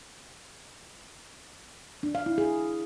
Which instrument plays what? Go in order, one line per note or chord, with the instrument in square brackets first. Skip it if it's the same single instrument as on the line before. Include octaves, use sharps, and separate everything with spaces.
[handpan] D4
F5
E4
G#4